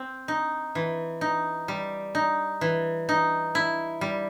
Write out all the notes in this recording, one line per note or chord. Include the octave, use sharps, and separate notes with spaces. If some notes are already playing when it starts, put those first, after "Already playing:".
Already playing: C4
D#4
E3
D#4
G3
D#4
E3
D#4
E4
G3